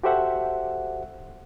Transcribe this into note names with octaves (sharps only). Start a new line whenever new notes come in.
F#4 G4 A4 C5 E5 F#5